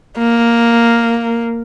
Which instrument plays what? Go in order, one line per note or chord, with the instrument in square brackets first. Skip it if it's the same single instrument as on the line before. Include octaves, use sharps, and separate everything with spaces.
[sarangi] A#3